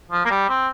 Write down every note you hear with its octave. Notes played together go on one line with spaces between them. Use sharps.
F3
A#3
G3
C4